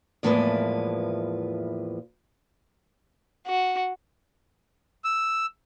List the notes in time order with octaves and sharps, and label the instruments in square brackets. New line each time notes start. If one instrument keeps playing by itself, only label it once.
[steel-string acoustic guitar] E2 A2 F3 G#3 A#3 B4
[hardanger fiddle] F#4
[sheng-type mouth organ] E6